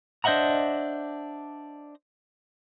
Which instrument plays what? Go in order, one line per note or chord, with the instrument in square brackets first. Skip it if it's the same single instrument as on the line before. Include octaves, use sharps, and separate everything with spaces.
[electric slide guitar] D4 C5 D#5 E5 F#5 A#5